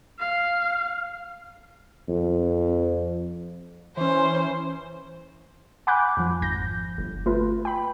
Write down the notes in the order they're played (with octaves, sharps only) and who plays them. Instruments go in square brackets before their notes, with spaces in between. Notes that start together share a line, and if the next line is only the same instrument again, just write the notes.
[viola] F5
[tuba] F2
[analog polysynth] E3 C#4 [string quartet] C5
[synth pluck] F#5 G#5 B5 D6 F#6 G6
F2 F3
G#1 G6 A#6
G1
A3 F4 B4
G5 B5